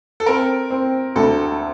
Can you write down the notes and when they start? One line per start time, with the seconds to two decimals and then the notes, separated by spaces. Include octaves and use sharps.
0.20 A4
0.26 C4 A#4
0.70 C4
1.15 D2 A4